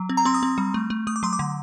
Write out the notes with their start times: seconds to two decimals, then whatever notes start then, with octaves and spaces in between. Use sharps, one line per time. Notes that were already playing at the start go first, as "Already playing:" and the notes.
Already playing: F#3
0.09 C4
0.17 A#5
0.25 C4 C6
0.34 D#6
0.43 C4
0.58 G3
0.74 A3
0.90 A3
1.07 A3 D#6
1.16 D6
1.23 F#3 C6
1.33 D6
1.39 D3